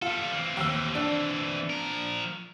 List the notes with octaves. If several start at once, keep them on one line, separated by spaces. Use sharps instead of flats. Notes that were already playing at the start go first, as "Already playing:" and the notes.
G3 F4 A4
E3 C4
D#2 E6
D4
F3 A#4